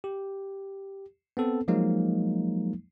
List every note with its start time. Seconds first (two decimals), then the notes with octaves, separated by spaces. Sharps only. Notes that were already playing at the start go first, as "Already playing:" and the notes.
0.04 G4
1.37 B3 C4 A4
1.68 F3 F#3 G#3 A#3 D#4